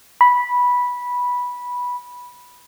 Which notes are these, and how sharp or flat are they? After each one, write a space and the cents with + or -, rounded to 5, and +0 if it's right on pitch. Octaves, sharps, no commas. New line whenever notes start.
B5 -10